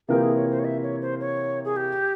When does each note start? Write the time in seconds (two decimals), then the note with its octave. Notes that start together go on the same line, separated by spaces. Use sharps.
0.08 C3 E3 A#3 F4 G#4 A#4
0.16 G4
0.22 G#4
0.36 C#5
0.51 C5
0.59 C#5
0.65 E5
0.83 C#5
1.02 C5
1.20 C#5
1.65 G#4
1.76 G4